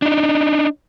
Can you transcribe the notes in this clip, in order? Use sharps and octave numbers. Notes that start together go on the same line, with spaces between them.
D4 D#4